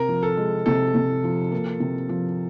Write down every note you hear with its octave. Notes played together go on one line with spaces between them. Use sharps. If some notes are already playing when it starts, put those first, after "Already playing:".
Already playing: C3 A#4
F3
A4
G#3
C3 A4
C3
F3
A#3
C3
F3